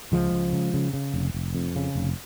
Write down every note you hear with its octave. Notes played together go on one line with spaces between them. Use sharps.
C#2 F3 G#3
C#2
C#3
C#3
C#3
F1
F1
F2
C#3
F1